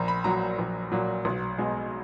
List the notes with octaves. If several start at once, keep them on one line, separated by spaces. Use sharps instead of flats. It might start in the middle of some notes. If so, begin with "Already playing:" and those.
Already playing: A#1 A#5
B5
A#2 F#3 A#5
A#1
A#2 F#3
B1
B2 G#3